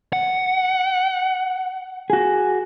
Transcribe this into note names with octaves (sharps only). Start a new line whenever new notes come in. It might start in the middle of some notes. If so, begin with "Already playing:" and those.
F#5
F#4 G#4